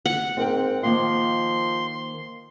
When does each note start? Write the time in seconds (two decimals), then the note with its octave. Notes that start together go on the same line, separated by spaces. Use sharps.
0.06 F#5
0.37 G#2 C4 A#4 G5
0.83 D#3 F3 A#3 F5 C6